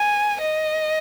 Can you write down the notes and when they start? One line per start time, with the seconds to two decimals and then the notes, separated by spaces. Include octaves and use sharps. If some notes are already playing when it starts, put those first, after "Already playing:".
Already playing: G#5
0.41 D#5